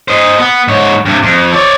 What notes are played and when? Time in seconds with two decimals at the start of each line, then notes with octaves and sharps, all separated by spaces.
0.08 C5 D#5
0.38 B3
0.68 G#2 C#5
1.05 G2 C3
1.23 F2
1.53 C#5 D5